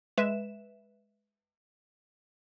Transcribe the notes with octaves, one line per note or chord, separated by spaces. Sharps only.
G#3 B4 E5 E7